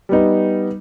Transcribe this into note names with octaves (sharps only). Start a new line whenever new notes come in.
G3 B3 D#4